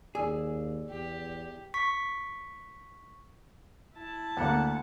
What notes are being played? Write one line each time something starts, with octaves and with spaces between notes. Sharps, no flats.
D#2 G#4 D5 G#5 E6
E2 G4
C#6 B6
E4 A5
D2 A#3 F#5